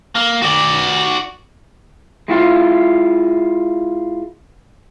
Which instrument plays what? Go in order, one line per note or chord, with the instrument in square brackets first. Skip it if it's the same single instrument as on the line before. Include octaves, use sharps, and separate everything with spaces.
[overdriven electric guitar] A#3
F#4 D5
[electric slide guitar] G#3 E4 F4